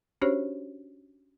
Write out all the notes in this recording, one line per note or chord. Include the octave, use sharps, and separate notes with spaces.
C#4 D4 F#4 G4 C5 C#5